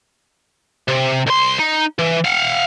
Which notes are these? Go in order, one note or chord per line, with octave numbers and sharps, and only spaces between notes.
C3
C2 C6
D#4
E3
F5 F#5